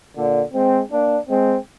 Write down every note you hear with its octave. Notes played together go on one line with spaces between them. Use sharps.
A#2 D3
G#3 C4
A#3 D4
G#3 C4